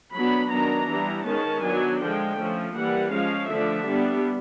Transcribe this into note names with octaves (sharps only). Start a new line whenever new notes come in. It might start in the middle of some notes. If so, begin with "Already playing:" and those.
F#3 B3 D4 B5
D#3 F#3 B3 D4 A#5
E3 G3 B3 D4
D#3 G#3 C#4 A5
F#3 B3 D4 G#5
D3 F3 G#3 G5
F3 A3 C#4
E3 G3 A#3 F#5
F3 G#3 C#4 F5
D3 F3 A3 D4 E5
G3 B3 D4